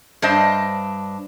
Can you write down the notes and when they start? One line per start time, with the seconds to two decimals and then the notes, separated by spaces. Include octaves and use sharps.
0.22 G2 D4 C5 D#5